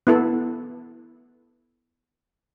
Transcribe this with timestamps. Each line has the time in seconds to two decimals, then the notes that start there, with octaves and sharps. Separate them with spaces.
0.07 B3 E4 A4